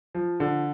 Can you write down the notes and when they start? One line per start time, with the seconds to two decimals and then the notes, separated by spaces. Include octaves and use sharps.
0.15 F3
0.40 D3